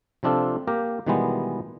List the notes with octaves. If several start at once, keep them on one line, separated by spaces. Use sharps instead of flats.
C3 F3 C4 D4 F4 A4
A#3 G4 A#4
B2 D#3 E3 G3 G#3 B3